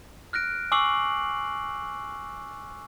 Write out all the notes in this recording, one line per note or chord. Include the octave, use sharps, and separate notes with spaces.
F6 F#6 A#6 D7
G#5 C#6 D6 E6 C7 F#7